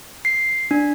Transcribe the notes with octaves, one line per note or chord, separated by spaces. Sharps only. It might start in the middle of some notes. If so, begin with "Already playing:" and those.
C7
D4